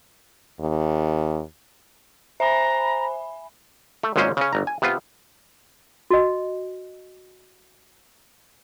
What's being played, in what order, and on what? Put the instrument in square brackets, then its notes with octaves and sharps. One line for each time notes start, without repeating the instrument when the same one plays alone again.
[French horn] D#2
[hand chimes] C5 [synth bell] E5 G#5 B5 [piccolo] A#5
[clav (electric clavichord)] A3
G#1 A#2 F#3 G#3 C#4 C5
C#3 C#4
G1 A#5
G#5
C3 B3 F4
[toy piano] F#4 D#5